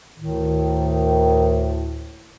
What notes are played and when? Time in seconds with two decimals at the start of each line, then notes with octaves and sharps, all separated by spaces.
0.18 D2 A2 D#3